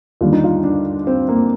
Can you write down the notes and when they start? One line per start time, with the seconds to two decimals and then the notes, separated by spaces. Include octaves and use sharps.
0.21 D#2 D3 G3 F4
0.33 D#4
0.44 F4
0.64 D4
1.07 C4
1.29 A#3